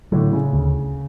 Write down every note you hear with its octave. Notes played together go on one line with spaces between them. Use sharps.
A2 D3 F#3
C#3
D2